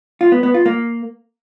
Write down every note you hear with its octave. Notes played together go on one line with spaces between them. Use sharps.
F4
B3
B3
F4
A#3